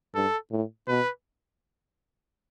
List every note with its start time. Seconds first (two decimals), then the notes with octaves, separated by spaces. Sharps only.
0.15 G2 A4
0.51 A2
0.88 B2 B4